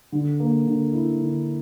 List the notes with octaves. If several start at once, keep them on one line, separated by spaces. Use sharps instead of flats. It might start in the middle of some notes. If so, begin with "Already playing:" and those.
D3
A#3
D3
E4
D3